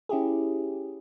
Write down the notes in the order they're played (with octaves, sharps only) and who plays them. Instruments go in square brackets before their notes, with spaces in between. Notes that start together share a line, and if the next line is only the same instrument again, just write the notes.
[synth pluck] C#4 E4 G4 G#4